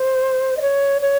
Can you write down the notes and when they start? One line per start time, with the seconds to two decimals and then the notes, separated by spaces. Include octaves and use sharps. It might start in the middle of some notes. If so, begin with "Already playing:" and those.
Already playing: C5
0.57 D#5
0.61 C#5
1.01 C#5